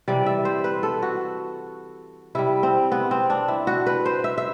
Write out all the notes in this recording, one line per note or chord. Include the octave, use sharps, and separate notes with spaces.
C3 E3 G3 D5
E5
C5
B4
A4
F#4
C3 G3 E4
C4
B3
C4
D4
E4
F#4
B4
C5
E5
E5